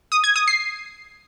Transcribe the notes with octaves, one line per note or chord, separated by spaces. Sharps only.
D#6
G#6
D#6
C7